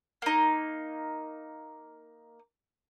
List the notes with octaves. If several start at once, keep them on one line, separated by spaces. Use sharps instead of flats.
A#3 D#4